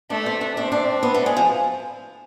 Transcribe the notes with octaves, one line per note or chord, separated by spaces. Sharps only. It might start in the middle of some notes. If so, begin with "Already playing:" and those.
A3 D4
C4
D4
C4 D4
D4
B3
A3
G#3
F3